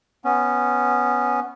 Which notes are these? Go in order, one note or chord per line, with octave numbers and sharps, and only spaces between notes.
B3 C#4